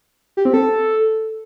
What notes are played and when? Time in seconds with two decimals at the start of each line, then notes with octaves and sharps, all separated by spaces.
0.37 G4
0.45 C4
0.54 A4